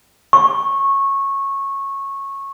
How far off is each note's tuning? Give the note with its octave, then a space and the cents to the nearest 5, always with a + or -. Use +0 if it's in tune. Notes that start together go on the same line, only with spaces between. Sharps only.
C#6 -15